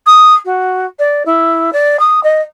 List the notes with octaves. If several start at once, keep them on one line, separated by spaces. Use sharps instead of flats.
D#6
F#4
D5
E4
D5
D#6
D#5